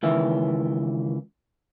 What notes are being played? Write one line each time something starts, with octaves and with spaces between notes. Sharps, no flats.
C#2 D#3 E3 E5